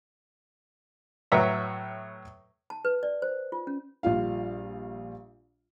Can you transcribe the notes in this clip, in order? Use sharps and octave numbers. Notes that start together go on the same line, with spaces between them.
A2 F#3 B4 E5 A#5
A5
B4
D5
C5
F4
C#4
A#1 G3 F4 F5